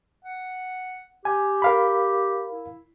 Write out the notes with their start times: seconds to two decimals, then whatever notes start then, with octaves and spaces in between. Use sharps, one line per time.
0.25 F#5
1.25 G4 G#5
1.62 A#4 F5 B5
2.52 E4